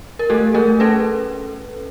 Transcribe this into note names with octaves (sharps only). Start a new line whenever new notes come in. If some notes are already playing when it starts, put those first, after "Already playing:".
A#4
A3 G4 A4
A3 G#4 A#4
C#4 A4 B4